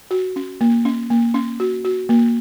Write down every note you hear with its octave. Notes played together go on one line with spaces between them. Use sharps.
F#4
C#4
A#3
C#4
A#3
C#4
F#4
F#4
A#3